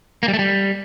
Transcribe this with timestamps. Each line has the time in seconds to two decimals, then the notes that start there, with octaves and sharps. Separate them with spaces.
0.23 A#3
0.28 G3
0.33 A3
0.39 G3